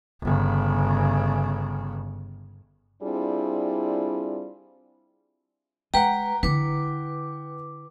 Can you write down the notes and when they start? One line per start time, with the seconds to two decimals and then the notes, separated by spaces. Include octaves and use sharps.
0.22 G1 C#3
3.03 G3 C4 D4 E4 F4 G#4
5.94 G#3 B4 F#5 G5 A#5
6.43 D3 E4 B4 D6